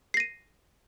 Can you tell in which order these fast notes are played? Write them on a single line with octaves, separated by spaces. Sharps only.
C7 A#6 D#7